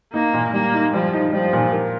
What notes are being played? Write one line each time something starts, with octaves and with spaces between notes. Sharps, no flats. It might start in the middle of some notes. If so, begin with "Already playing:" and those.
A#3 D#4
A#2
G3 A#3
D#4
F3 G3
D#4
F3 G3
A#2
A#3